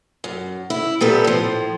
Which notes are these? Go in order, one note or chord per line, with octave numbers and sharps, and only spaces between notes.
F#2
E4
A#2 B3 G4 A4
A2 F3